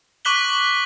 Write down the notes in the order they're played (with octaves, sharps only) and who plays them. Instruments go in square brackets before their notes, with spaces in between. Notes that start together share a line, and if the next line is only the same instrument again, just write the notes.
[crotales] C#6 D6 F#6 B6 F#7 G7